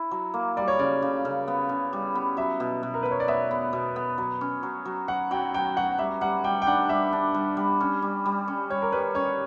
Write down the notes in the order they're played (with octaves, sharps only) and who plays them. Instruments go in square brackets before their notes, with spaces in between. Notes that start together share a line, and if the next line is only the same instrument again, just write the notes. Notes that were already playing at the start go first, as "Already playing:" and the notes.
Already playing: [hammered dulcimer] E4
F#3
A#3
[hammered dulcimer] G3 [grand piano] D5
[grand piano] C#5
[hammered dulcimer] C#3 [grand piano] D5
[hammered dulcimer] C#3
C#3
B3
C#3
G3
B3
[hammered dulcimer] F#3 [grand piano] E5
[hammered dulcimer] B2
B2
[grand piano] A#4
[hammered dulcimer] B3 [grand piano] B4
[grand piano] C#5
D5
[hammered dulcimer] B3 [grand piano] E5
[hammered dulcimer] B3
B2
B3
F#3
C#4
F#3
F#3
[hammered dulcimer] F#3 [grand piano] F#5
[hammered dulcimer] F#3 [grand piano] G5
[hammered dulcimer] F#3 [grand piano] G5
[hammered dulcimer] F#3 [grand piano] F#5
[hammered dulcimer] G3 [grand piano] E5
[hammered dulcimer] G3 [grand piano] F#5
[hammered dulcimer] G3 [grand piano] G5
[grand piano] G5
[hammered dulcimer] D4 [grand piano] F#5
[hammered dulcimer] G3 [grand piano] E5
[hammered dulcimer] D4
G3
G3
C#4
G3
G3
C#4
[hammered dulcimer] G3 [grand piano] C#5
[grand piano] A#4
[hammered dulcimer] G3 [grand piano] B4
[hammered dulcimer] C#4 [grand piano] C#5